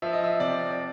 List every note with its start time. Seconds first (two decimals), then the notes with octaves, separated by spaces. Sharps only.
0.02 F3 E5
0.13 D#5
0.24 E5
0.40 C3 D5
0.71 D5